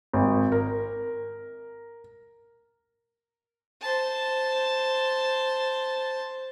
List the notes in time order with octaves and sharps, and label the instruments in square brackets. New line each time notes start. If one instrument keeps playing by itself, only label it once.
[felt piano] G#1
A#4
[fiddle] C5 A5